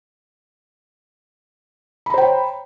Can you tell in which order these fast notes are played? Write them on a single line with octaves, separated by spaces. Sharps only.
B5 A#5 C5 G5 C#5